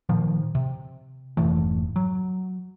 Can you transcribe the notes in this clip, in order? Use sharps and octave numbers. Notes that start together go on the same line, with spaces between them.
A#2 D#3 F3
C3
F1 G#2 E3 A3
F#3